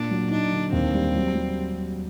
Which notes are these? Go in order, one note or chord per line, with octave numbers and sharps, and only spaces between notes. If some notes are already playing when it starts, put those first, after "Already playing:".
Already playing: A#2 D4
F#3
D4 D#4
D3
D#2 C4
G3
F#3
F#3